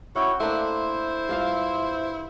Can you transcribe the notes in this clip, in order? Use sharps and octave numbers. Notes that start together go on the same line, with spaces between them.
C#4 E4 F#4 F#5 G5
A3 A#3 D4 E4 C5
G2 F4 F5